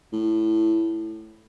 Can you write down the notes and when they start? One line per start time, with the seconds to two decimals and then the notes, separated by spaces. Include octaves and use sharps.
0.12 A2